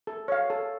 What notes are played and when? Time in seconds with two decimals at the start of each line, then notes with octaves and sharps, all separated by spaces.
0.07 A4
0.28 C#5 F5
0.50 A4